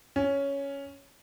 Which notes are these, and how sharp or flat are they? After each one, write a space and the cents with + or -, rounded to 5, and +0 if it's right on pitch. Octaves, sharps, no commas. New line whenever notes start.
C#4 +5